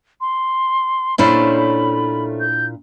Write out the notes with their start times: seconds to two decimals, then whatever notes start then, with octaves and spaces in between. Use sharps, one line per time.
0.21 C6
1.18 A#2 A3 C#4 D4 E4 C5 B5
2.40 G6